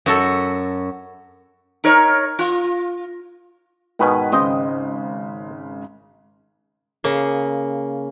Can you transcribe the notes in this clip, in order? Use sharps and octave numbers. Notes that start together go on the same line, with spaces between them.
F#2 F#4 A4
D#4 A#4 C#5
F4
G#2 B2 D#3 B4 G#5
G#1 C#3 C5 D#5 G5
C#3 A#3